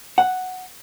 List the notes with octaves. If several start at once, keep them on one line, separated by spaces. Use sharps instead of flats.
F#5